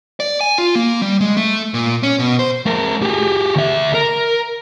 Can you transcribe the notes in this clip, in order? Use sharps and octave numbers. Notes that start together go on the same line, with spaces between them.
D5
G#5
F4
A#3
G3
G#3
A3
A#2
C#4
B2
C5
A3 A#4
G4 G#4
D2 E5
A#4